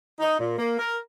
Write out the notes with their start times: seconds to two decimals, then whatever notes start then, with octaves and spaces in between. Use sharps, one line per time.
0.19 D#4
0.40 A#2
0.59 A#3
0.79 A#4